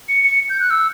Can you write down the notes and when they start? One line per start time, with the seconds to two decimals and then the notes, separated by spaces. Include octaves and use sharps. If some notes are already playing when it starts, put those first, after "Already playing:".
0.09 C#7
0.24 C#7
0.50 G6
0.60 F#6
0.70 E6